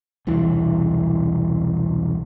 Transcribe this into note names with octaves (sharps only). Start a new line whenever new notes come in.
E1 C2 E3